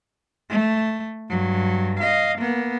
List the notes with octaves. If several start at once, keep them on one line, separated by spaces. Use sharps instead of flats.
A3
G2 F#3
D#5 F5
A#3 B3